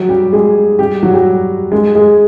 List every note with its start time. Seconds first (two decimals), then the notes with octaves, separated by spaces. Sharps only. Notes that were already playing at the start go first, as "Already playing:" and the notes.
Already playing: F#3 F#4
0.09 G3 G4
0.32 G#3 G#4
0.79 G3 G4
1.03 F#3 F#4
1.14 G3 G4
1.72 G#3 G#4
1.95 G#3 G#4